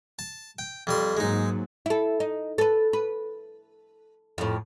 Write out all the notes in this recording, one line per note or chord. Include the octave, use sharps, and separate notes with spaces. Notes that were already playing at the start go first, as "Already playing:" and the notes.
A5
G5
F2 G3 C6
G#2 F#3 G#3 A#3 D#4
E4 A4
D#4
A4 B4
B4
F2 A2